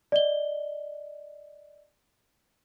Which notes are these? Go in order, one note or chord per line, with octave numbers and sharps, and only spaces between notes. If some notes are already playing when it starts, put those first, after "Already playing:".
D5 D#5 G7